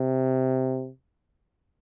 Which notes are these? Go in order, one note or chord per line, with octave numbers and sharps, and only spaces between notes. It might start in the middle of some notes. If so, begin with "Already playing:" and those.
Already playing: C3